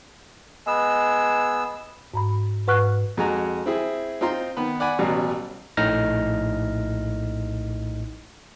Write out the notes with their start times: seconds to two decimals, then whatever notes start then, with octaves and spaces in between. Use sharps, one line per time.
0.67 G#3 B3 E6
2.14 G#2 A#5 B5
2.67 G#2 B4 F#5 C#6 F6 F#6
3.17 F2 G#3 F#4 G#5 A#5
3.66 C4 E4 G#4
4.21 C4 D#4 F4 A#5 C6
4.57 D#3 B3 B4
4.80 D5 F#5 G#5 B5
4.99 A1 B2 F#3 G3
5.77 A#1 A2 D#4 F6 A#6